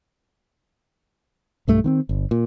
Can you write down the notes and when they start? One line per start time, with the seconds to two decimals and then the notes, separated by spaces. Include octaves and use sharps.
1.68 B1 G2 A3
1.84 D#3 B3 C4
2.09 G1
2.31 A#2